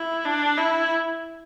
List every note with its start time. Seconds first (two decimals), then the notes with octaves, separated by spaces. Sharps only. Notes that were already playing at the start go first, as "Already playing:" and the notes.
Already playing: E4
0.25 D4
0.57 E4